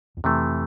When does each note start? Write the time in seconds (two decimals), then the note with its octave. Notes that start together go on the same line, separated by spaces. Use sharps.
0.17 E2
0.24 F2 C3 E3 A3